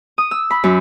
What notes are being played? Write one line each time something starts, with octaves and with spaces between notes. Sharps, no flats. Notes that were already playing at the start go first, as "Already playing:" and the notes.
D#6
E6
B5
F#2